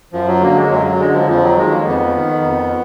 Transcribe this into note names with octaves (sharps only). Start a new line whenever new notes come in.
F#2 F3
F#3
D3 A#3
G#3
F#2 F#3
F#3
D3 G#3
F3
F2 F3
F#3
D#3 G#3
A#3
F2 B3
D#3
F2